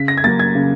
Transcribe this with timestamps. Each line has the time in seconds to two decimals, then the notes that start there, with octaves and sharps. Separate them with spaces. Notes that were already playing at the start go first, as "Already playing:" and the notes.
Already playing: C#3 B6
0.08 A#6
0.17 G#6
0.24 F#3 A#3 A6
0.40 G#6
0.55 C#3